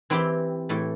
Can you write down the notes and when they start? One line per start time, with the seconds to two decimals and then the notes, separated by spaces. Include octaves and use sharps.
0.10 E3 C4 E4 G4
0.69 A2 E3 A3